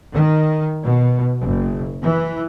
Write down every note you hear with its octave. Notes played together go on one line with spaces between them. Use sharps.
D#3
B2
F#1
E3